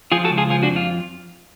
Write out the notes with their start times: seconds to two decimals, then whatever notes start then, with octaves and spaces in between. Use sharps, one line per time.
0.12 F3 F4 G#4
0.24 F#4 A4
0.30 C#2
0.37 F4 G#4
0.50 F3 F4 G#4
0.63 D4 F#4
0.70 F2
0.76 F4